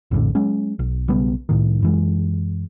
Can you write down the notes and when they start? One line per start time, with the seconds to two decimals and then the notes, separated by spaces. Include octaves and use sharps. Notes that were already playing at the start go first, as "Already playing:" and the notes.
0.11 A#1 F2 A2 D3
0.35 F#3 G#3 C#4
0.79 B1
1.08 B1 C#3 G3 B3
1.49 C2 A2 D#3
1.82 F#2 E3 G#3